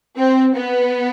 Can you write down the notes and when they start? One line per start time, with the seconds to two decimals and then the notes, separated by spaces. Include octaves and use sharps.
0.18 C4
0.55 B3